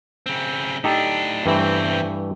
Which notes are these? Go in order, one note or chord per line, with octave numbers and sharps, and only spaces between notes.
C#3 C4
A2 D4 D#4 G4 A4
E2 G2 E3 A3 C4